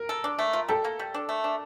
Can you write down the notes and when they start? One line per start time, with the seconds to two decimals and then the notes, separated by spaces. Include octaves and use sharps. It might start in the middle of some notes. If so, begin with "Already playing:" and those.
Already playing: A#4
0.09 A4
0.24 D4
0.39 A3
0.53 F4
0.68 G3 A4
0.84 A#3
0.99 G3
1.14 D4
1.29 A3
1.44 D4